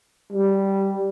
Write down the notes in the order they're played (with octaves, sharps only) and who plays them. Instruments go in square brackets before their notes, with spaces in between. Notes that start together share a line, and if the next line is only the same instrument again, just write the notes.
[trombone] G3